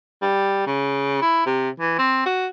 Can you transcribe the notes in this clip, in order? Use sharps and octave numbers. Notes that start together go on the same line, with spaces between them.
G3
C#3
E4
C3
E3
C4
F#4